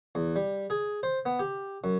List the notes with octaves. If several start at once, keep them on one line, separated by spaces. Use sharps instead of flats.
E2
G3
G#4
C5
B3
G4
F#2